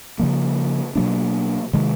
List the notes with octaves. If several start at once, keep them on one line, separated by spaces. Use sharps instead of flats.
C#3 F3 A#3
B2 F#3 A#3 D4
C3 D#3 G#3